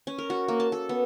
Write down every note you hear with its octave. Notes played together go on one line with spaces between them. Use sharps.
C#4
A#4
F#4
A#3
A5
A4
B3